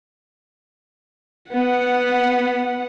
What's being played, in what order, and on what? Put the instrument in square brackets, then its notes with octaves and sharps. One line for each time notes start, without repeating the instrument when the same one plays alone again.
[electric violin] B3 F#5